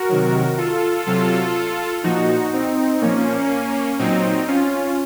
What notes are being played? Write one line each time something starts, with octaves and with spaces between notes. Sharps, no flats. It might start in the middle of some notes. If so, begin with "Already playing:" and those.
Already playing: F#4 A#4
C3 D#3 F#3
F4 A4
C3 F#3 F4 A4
A#2 F3 D#4 F#4
C4 D#4
A#2 F3 A#3 C#4
A#2 F#3 C4 D#4
C#4 F4